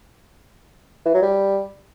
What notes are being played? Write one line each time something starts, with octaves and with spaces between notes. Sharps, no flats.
E3
F#3
G3